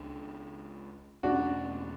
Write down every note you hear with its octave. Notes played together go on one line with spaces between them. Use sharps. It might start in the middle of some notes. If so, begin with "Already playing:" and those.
Already playing: C#2 C#3 D4
E2 B2 A3 C#4 D4 F#4